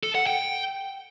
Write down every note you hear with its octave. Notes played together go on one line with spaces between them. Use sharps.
A4
F#5
G5